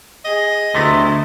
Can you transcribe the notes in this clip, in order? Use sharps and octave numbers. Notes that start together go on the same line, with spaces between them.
G#4 D#5
D2 C3 A3 B3 E4